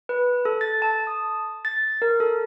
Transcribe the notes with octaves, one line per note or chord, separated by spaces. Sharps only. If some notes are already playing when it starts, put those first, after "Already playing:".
B4
A4
A6
A5
D#6
A6
A#4
A4